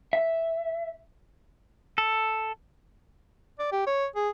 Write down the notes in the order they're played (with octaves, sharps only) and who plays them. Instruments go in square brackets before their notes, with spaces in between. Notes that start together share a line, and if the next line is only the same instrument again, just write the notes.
[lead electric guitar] E5
[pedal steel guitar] A4
[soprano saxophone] D5
G4
C#5
G#4